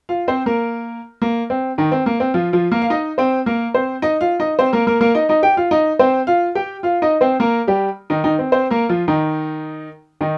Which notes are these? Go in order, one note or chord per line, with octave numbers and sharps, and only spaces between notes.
F4 F5
C4 C5
A#3 A#4
A#3
C4
D#3 D#4
C4
A#3
C4
F3 F4
F3 F4
A#3 A#4
F5
D#4 D#5
C4 C5
A#3 A#4
C4 C5
D#4 D#5
F4 F5
D#4 D#5
C4 C5
A#3 A#4
A#3 A#4
A#3 A#4
D#4 D#5
D#4 D#5
G4 G5
F4 F5
D#4 D#5
C4 C5
F4 F5
G4 G5
F4 F5
D#4 D#5
C4 C5
A#3 A#4
G3 G4
D#3 D#4
D#3 D#4
C4
C4 C5
A#3 A#4
F3 F4
D#3 D#4
D#3 D#4